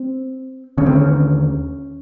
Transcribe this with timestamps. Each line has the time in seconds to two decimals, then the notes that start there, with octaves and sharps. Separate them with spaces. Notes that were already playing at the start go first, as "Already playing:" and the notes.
Already playing: C4
0.78 D3 C#4
0.81 D#2 C4
0.95 C#4